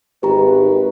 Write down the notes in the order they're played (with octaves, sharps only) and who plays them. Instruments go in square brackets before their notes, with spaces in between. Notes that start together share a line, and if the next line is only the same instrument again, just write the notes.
[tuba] G#1 [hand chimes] G4 A#5 [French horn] B4